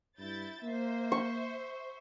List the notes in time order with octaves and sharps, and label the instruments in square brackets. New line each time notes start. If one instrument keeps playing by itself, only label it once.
[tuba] G2 [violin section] E4 G6 A6
[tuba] A#3 [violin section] C5 E5
[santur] C#6